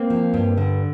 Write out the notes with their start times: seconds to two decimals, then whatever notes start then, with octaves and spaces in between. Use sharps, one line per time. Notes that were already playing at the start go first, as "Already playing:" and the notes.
Already playing: A#3 C4
0.10 F3
0.34 G2
0.58 D3